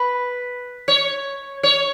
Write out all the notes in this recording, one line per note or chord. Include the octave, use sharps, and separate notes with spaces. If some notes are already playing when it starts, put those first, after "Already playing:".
Already playing: B4
C#5
C#5